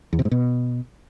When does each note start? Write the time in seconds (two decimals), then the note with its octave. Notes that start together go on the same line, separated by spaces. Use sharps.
0.13 E2
0.19 C3
0.25 G#2
0.31 B2